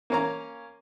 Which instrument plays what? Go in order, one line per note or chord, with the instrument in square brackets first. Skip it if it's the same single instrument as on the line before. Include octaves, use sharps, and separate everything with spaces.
[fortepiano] A#3 C#4 A#5